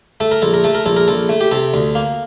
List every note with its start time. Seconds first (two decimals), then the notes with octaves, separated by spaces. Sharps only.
0.20 A3 A4
0.32 A#4
0.42 A#1 A4
0.54 A#4
0.64 A3 A4
0.75 A#4
0.86 A#1 A4
0.97 A#4
1.08 A#1 A4
1.29 A3
1.41 G4
1.51 C3 A4
1.74 D2
1.95 A#3